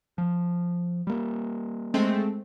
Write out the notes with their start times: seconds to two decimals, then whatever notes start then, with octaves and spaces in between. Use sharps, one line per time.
0.18 F3
1.07 G3 A#3
1.94 G#3 A3 C4